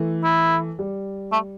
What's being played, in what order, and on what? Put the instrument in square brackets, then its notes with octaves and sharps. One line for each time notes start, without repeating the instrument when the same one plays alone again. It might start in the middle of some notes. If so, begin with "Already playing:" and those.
Already playing: [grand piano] E3 A3
[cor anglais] E4
[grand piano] G3
[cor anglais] A3